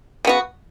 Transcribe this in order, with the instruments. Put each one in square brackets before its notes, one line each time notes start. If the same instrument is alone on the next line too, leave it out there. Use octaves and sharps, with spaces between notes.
[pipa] C#3 B3 F#4